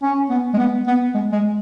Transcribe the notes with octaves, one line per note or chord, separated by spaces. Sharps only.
C#4
B3
G#3
B3
B3
G#3
G#3